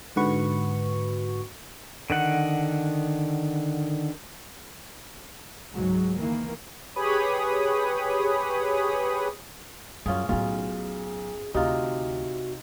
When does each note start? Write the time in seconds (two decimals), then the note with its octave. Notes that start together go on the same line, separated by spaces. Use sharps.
0.16 G#2 D3 F#4 B4 C#6
2.10 D3 D#3 F#5
5.73 C#2 G#2 F#3 G#3
6.19 D#3 E3 A#3
6.96 G4 G#4 B4 C#5 B5 D#6
10.06 F#2 G3 C#4 F4 G#4
10.29 B1 A2 D#4 F4 G#4
11.54 D2 C3 D#4 F4 F#4